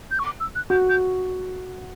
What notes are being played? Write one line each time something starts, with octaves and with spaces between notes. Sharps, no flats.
G6
C#6
D6
E6
F#6
F#4 G6
G6